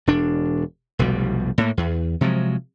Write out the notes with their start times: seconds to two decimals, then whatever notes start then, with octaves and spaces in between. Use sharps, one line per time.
0.07 E1 D4
0.99 F1 B1 B2 G3
1.58 A2 A#3
1.77 E2
2.21 C3 F3 F#3 G#3